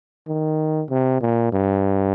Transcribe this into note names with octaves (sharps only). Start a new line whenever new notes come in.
D#3
C3
A#2
G2